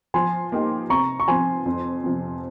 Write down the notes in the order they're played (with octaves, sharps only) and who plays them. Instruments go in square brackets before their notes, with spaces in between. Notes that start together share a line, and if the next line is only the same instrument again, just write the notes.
[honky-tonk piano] F3 [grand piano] G#5 C6
[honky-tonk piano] A#3 D#4 G4
[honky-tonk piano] C3 [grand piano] A#5 C#6
[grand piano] C#6
[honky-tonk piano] F3 C4 [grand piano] G#5 C6
[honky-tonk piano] F2
C3 F3 C4